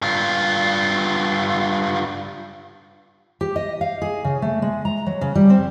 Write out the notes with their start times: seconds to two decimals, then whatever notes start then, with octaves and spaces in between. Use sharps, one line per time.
0.02 G2 F4
3.41 G4
3.56 D#5
3.81 F5
4.02 G#4
4.24 C#3
4.42 A3
4.62 G#3
4.85 A#5
5.06 F#3
5.21 C#3
5.35 G3
5.50 C4